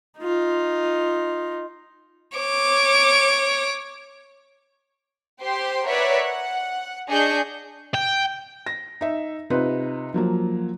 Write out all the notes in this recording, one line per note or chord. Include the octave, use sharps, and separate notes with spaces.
D#4 F4
C#5 D6
G4 C5 G5 C6
A#4 B4 C#5 D5 E5 F#5
F#5
D4 G#4 D#5 G#5 C#6 G6
G5
A#6
D#4 E5
C3 D#4 F4 B4
F3 F#3 A#3